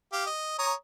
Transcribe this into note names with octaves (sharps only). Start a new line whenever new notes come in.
G4 F5
D#5
C#5 A#5 D#6